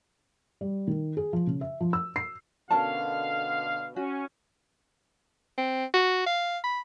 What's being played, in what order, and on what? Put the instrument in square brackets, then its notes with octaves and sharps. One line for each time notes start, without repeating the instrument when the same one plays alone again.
[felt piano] G3
D#3
G#4
F3
C#3
E5
F3
E6
C7
[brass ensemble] B2 D3 F5 [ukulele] C#4 A#4 A5
[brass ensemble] C#4 [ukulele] F#4
[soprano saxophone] C4
F#4
F5
B5